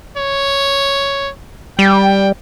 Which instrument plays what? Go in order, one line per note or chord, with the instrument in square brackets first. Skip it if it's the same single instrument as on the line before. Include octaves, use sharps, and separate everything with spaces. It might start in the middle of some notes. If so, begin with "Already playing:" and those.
[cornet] C#5
[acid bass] G3 [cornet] G5